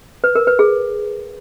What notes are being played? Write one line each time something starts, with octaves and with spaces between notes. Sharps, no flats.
B4
A#4
B4
G#4